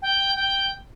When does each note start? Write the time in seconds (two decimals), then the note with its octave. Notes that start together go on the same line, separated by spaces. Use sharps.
0.02 G5
0.36 G5